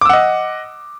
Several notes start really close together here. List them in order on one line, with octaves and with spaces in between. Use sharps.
D6 E6 F#5 D#5